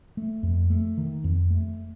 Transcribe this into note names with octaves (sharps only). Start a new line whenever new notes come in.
A3
F2
A3
D#3
F2
A3